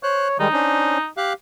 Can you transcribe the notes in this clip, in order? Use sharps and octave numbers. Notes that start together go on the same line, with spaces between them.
C5 C#5 F#6
D#3 G3 G#3 D#4
C#4 D4 C5
G4 F5 F#6